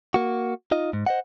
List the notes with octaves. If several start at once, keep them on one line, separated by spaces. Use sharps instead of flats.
A#3 F#4
D#4 F4 D#5
G#2
C5 D#5 F#5